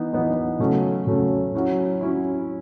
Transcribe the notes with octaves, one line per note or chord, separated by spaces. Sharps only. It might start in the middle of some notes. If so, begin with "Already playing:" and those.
Already playing: E3 B3 D#4
E3 B3 D#4
C#3 F#3 A3 C#4
C#3 F#3 A3 C#4
F#3 C#4 E4
F#3 C#4 E4